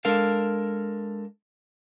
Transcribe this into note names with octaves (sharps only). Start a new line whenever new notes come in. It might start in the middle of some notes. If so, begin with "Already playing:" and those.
G#3 D4 A4 A#4 F5